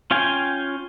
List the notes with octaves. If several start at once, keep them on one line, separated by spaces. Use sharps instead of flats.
C#4 F4 F5 G5 G#5